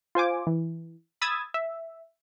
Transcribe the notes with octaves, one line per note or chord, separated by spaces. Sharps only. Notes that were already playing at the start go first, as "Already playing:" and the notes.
F4 C5 G#5 D6
E3
B5 D#6 E6 G#6 A6
E5